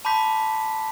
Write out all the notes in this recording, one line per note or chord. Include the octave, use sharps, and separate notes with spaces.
A5 B5 C6 D6 G6 B6